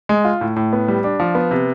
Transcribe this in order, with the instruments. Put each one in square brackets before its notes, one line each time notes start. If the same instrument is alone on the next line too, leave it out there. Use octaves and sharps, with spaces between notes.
[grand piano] G#3
F4
A2
A2
B3
G3
D4
F3
B3
C3